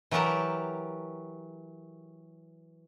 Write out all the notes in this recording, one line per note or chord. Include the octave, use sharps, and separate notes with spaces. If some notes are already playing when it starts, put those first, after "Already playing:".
E3 F#3 G4 A#4 A5 A#5